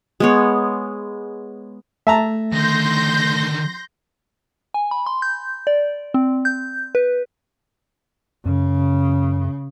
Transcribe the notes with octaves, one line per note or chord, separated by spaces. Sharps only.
G#3 B3 C#5
A3 E5 A5 A#5
D3 D#3 C6 G6 A#6
G#5
B5
C6
G6
D5
C4
G6
B4
F#2 C#3